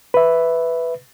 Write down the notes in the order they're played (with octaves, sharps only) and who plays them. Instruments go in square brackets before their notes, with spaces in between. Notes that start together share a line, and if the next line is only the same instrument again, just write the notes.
[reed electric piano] B4 E5